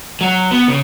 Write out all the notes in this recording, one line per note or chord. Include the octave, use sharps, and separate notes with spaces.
F#3
B3
C#3